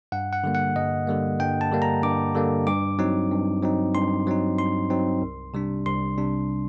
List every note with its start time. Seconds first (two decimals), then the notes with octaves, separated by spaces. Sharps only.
0.12 G2 F#5
0.33 F#5
0.44 D3 G3 A#3
0.55 F#5
0.76 G2 D#5
1.07 D3 G3 A#3
1.40 G2 G5
1.61 A5
1.71 D3 G3 A#3
1.82 A#5
2.03 G2 D6
2.35 D3 G3 A#3
2.67 G2 D6
2.99 F#3 C4 D#4
3.31 G2
3.62 F#3 C4 D#4
3.94 G2 C6
4.27 F#3 C4 D#4
4.58 G2 C6
4.90 F#3 C4 D#4
5.22 C2
5.54 C3 G3 D4
5.86 C2 C6
6.18 C3 G3 D4